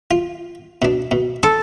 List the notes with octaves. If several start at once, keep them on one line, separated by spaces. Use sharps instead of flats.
F4
B2 D4
B2
A4 C6